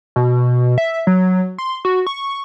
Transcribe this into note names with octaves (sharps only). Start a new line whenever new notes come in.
B2
E5
F#3
C6
F#4
C#6